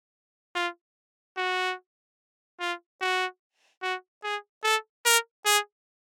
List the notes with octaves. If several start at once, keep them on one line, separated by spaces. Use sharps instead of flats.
F4
F#4
F4
F#4
F#4
G#4
A4
A#4
G#4